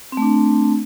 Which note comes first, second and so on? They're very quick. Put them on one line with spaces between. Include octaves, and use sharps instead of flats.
C4 A3 D4